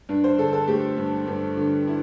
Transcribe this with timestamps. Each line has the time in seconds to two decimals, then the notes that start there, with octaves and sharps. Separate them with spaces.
0.09 G2 D4
0.24 C5
0.38 D3 A4
0.53 A4
0.68 A3 G4
0.97 G2
1.27 G2
1.57 D3
1.87 E4